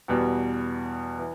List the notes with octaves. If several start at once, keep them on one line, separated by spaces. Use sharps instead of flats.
E2 B2 G3
E3